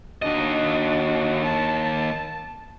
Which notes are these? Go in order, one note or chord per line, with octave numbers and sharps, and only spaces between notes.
D#2 D4 F#4 D#5
A5